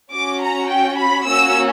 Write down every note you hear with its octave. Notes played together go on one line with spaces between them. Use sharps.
C#4 F#4 D6
A#5
G5
B5
A#3 C#4 F#4 E6